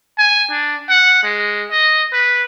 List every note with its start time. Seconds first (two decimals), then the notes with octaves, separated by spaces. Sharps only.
0.18 G#5
0.50 D4
0.89 F#5
1.23 G#3
1.71 D#5
2.13 B4